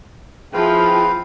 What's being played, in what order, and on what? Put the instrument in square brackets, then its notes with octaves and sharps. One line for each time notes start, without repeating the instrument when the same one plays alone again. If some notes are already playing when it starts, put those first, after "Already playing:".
[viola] F3 [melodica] C4 B4 F5 [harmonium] E4 G#4 G5